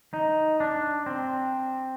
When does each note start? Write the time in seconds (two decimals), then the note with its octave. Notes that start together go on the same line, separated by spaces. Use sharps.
0.14 D#4
0.60 D4
1.06 C4